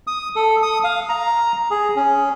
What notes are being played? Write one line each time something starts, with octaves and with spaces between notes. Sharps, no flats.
D#6
A4
D#6
F5
A#5
G#4
C#4